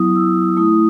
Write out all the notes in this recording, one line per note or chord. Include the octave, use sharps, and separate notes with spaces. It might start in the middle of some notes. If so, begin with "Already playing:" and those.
Already playing: F#3 B3 E4 D#6
E6
A3 E4 D#6